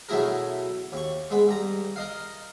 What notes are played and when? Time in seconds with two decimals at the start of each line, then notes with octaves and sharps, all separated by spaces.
0.09 B2 F#3 A3 E4 G#4 A#4
0.92 D#2 C#6
1.31 G#3 B3
1.48 G2 A#5
1.96 A#4 D#5 F5